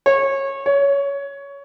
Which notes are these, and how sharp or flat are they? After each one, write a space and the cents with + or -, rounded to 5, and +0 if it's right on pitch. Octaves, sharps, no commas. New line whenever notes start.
C#5 -25
C#5 +15